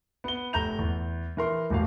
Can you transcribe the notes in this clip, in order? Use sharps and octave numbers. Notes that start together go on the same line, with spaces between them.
B3 G7
F1 A#5 G6 F7
E2
E3 A#4 C6
E1 A1 F5